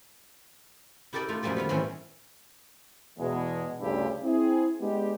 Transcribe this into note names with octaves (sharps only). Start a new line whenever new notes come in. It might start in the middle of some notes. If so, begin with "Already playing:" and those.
E4 G4 A4 A#4 D5 D#5
A3 D#4 F4
F#2 A#2 F3 G3 A3 D5
D#3 F3 B3
A2 E3 G3 C4 C#4 E4
E2 B2 G#3
D2 G2 C#3 D4 E4 G4
C4 E4 G#4
G#3 B3 D4 G4